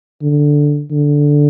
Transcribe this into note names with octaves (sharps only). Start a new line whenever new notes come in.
D3
D3